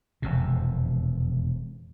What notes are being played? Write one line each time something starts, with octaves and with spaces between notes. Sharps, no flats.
E1 F2 C3